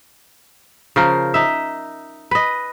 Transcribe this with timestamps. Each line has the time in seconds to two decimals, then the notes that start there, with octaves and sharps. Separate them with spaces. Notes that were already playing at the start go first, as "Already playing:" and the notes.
0.96 C#3 F3 A#4
1.34 D#4 E5
2.31 B4 D#5